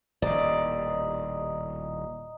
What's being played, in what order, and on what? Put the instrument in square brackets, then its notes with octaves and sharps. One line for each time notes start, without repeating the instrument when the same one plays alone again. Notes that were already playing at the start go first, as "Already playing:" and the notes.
[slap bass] D#1 D#2 A2 [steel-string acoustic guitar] D5 [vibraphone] D#5 A#5 D#6